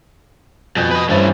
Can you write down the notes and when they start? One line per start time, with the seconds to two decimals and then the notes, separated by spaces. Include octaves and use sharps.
0.76 F2 B2 G#5 G6
0.91 B4 D#5
1.09 G2 E3 C#4 C5 A6